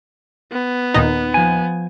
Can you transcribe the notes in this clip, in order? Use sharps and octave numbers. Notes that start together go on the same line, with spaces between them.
B3
D#2 A#2 D#4
F3 G#5